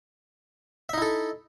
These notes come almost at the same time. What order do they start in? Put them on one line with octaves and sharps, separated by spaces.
E5 D#4 E4 A4